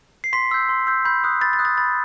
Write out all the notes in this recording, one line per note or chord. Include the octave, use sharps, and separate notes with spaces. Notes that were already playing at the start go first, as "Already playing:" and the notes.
C7
C6 B6
E6 G6
C6
E6 G6
B5 G6
D#6 F#6
B5 A6
A6
D#6 F#6
A6
B5 A6